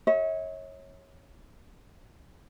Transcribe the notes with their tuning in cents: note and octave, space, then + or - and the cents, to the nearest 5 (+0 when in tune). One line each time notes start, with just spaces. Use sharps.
C#5 -15 E5 -45